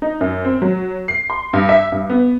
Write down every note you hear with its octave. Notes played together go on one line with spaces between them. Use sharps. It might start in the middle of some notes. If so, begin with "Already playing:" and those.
D#4
F#2
C4
F#3
C7
C6
G2
E5
G2
B3